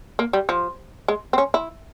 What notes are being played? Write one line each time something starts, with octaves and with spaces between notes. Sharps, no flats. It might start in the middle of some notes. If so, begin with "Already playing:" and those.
A#3
G3
F3
G#3
C4
C#4
E4